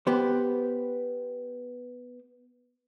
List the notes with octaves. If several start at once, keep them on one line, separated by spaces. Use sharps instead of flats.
B3 G4 C5